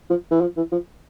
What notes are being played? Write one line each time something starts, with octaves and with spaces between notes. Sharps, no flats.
F3
E3
F3
E3
F3